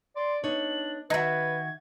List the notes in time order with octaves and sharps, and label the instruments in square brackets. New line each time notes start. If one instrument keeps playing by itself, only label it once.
[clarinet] D5 [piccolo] C6
[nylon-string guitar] B3 D#4 C#5 [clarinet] D4 [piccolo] F#7
[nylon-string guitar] D#3 E5 [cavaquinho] D#4 F#4 [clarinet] B4 [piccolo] G#6